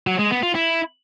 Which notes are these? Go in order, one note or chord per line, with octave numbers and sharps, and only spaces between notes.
F#3
G#3
B3
F4
E4